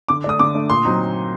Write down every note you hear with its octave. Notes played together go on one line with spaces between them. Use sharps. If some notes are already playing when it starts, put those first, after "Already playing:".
D3 D6
A3 D4 D#6
D3 D6
A3 D4
A#2 C6
F#3 C4 D#4